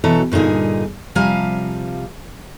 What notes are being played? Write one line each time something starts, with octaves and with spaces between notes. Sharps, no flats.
B2 E3 F#3 A4 A#5
G2 A#2 D3 D#4 G#4
C3 F3 G3 F5 G#5 A#5